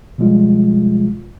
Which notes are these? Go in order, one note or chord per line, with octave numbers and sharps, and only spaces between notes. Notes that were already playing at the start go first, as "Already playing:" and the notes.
B2 F3 G3 G#3 F4